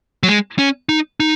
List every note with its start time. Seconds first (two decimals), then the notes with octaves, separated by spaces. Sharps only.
0.23 F#3
0.28 G#3
0.59 C#4
0.89 D#4
1.20 D#4